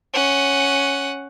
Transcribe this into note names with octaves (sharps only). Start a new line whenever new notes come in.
C#4 F#5